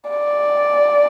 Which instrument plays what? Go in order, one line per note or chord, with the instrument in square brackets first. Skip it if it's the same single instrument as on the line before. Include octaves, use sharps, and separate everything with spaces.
[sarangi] D5